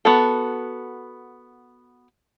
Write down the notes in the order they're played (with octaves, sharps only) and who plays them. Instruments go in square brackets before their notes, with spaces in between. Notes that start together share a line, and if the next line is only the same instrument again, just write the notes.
[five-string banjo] B3 F#4 A4